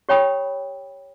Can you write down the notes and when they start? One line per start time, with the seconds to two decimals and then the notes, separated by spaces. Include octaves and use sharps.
0.09 G4 C#5 G5 B5 D#6